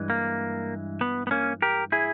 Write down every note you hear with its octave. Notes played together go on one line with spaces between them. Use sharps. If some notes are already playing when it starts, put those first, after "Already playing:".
Already playing: G2 E3 G#3
A#3
B3
B3
A#3 C#4
G4 A#4
E4 G#4